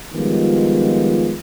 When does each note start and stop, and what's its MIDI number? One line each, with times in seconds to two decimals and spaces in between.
0.14 1.36 51
0.14 1.36 53
0.14 1.36 55
0.14 1.36 56
0.14 1.36 59
0.14 1.36 65